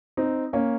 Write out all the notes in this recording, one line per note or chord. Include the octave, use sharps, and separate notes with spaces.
C4 D#4
A#3 C#4